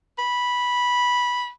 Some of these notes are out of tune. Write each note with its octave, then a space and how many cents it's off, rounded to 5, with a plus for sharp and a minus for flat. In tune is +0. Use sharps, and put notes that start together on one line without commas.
B5 -10